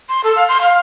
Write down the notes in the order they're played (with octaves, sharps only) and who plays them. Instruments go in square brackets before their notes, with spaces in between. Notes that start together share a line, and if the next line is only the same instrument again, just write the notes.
[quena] C6
A4
F5
C6
F5